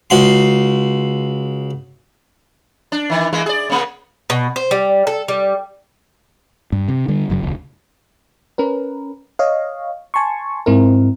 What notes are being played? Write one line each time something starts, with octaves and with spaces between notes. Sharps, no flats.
C#2 F#4 C6
D4
D#3 E3
E3 G#3 A#3
G#4 D5
C#3 A#3
B2
C5
G3
A4
G3
G2
C3
D3 G3
F#1 F#2 C#3 F#3
E1 C#2
C#4 A#4 B4
C#5 D#5 F5
G#5 A5 C6 C#6
G#2 C4 E4 A#4